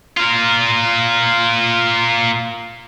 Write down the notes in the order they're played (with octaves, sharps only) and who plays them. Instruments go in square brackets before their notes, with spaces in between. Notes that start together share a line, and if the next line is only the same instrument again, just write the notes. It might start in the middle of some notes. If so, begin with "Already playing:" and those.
[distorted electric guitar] F4 A#4